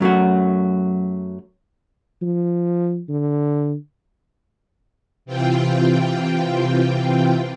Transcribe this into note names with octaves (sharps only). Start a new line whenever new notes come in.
F#2 F#3 A3 F#4
F3
D3
C3 E3 C4 F4 G5